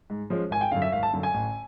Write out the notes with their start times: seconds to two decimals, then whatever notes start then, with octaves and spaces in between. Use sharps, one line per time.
0.10 G#2
0.30 F3 G#3 C#4
0.51 G#1 G#5
0.61 G5
0.72 F#2 D3 F5
0.82 E5
0.92 G#1 F5
1.03 A5
1.13 F#2 D3
1.23 G#5
1.34 A1